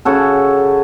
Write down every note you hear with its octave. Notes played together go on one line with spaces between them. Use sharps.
C#3 F#4 A4